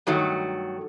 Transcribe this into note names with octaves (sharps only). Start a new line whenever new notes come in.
G2 D#3 F#3 A3